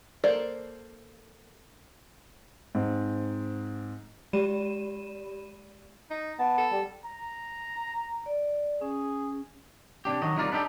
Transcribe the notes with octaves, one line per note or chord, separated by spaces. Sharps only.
A#3 A4 C5 D5
G#2 C4
G#3 G4 D5 B5 D#7 E7
D#4
B3 A5
A4
G3
A#5
D5
C#4 G#4
C3 D4 G4
D#3 F#3 D#5
C2 D#4 F4 A#4 D5
B3 D4 D#4 G4 A4